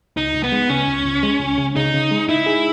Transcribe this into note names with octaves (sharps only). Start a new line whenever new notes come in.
C#2 D#4
C#2
B3
G#3
C#3 C#4
C#2
C#2
G#3
C#2
C#3
C#3 D#4
C#3
G#3
D#4 E4
G#4